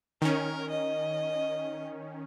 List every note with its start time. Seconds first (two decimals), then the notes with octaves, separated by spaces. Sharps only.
0.22 D#3 C#4 A#4
0.70 D#5